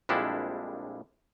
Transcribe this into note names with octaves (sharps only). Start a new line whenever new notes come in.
A#1 F2 G3 G#3 D4 E4